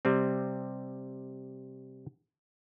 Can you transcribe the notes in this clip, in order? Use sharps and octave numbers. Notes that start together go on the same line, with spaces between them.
C3 G3 C4